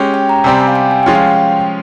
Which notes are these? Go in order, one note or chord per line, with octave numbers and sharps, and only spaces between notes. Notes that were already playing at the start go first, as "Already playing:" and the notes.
Already playing: G#3 C#4 G4
G5
A#5
C3 G3 C4 G4 G#5
G#5
F5
G5
G#5
F3 G#3 C#4 F4 G5
F5
G5